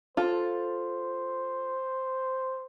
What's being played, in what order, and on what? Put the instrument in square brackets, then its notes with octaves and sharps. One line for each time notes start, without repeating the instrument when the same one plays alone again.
[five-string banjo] F4 A4 [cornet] C5